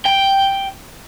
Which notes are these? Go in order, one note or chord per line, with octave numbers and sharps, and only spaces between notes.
G5